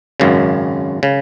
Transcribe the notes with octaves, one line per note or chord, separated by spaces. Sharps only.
G#1 F#2 C#3
C#3